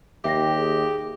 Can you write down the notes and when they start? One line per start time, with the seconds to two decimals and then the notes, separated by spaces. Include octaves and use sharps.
0.24 D#2 G4 E5 G5 A#6
0.58 G#4